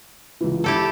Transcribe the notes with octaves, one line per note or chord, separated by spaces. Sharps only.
C#2 E3
E4 G4 A4 A5